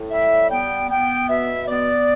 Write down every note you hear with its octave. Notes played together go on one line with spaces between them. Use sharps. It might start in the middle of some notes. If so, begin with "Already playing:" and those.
Already playing: A2
G3 E5
B3 G5
B3 G5
B2 E5
B3 D5